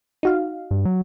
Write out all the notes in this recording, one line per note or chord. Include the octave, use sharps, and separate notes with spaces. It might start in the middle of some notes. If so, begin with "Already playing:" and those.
D#4 F#4 F5
G2
F#3